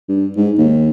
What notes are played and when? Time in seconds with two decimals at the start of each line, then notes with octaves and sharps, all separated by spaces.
0.09 G2
0.37 G#2
0.58 D#2